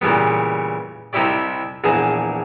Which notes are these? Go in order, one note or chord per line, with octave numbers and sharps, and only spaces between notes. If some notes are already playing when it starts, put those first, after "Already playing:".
A#2 C#3 E3 G3 B3
C2 C3 D#4 E4 G4 D5
A#1 E2 G#4 A5 A#5